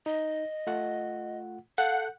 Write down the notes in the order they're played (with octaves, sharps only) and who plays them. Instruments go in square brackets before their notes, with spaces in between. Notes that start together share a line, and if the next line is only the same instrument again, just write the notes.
[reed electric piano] D#4 [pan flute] D#5
[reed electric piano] A3 F4 F#5
[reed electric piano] A4 G6 [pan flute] F5 [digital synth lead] F#5